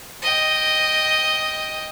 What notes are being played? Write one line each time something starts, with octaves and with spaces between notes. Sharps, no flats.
D#5 G5